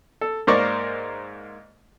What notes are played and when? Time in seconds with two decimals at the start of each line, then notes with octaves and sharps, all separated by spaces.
0.21 A4
0.47 G#2 A#3 A#4 C5 D5 C#6